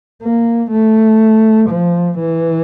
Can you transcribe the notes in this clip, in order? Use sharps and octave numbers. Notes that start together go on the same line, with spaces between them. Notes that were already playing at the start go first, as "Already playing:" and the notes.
A#3
A3
F3
E3